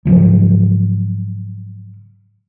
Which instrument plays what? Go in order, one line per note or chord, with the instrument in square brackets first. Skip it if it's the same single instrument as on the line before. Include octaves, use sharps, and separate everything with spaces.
[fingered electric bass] G#2 C#3 F3 F#3